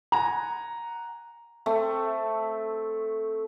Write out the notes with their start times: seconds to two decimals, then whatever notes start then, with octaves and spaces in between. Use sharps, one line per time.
0.12 F#5 G#5 A#5
1.66 A3 C4